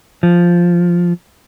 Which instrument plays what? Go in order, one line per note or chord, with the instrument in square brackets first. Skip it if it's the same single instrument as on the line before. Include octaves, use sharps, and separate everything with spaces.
[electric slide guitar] F3